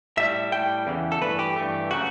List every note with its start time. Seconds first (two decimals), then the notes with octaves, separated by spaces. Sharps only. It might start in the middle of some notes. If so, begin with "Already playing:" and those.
0.17 A2 G3 E5
0.52 A2 G3 G5
0.87 E2 C#3 E3
1.12 A4
1.21 G2 E3 A3 B4
1.39 G4
1.56 G2 E3 A3
1.91 C#3 F#3 A3 F#4